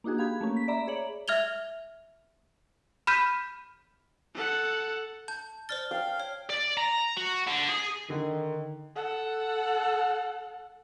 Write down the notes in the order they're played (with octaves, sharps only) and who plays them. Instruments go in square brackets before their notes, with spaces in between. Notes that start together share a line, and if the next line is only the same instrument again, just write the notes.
[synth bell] A#3 D4 D#4 F#4 G#4
G4 F5 B5 G#6
A3 A#3 C#4
B6
D5 E5 A#5 B5
G#4 C#5 D5 F#7
[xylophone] E5 F6 G#6 F7 G7
B5 F6 G6 B6 D#7
[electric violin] A4 F#5
[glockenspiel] A5 [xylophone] G6
[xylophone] C5 D5 A6 [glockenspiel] F6 G7
[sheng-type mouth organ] F5 [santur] G5
[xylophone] C#5
[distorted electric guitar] D5
A#5
F#4
D3
G#4
[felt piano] D3 [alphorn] D#3
[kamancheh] A4 F#5